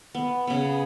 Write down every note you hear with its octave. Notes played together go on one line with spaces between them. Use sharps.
B3
C#3 B3